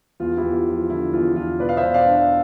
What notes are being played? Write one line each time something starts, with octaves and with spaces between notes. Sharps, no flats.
E2 F4
E4 G4
E2
F4
F3
F4
D3 E4
E2 F4
E2 F4
B2 B4 D5
F5
C5 E5
B2
D5 F5
D4